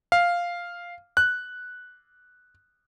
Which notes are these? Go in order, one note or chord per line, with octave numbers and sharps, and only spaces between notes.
F5
F#6